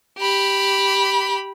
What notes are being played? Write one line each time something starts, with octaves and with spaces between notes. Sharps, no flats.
G4 B5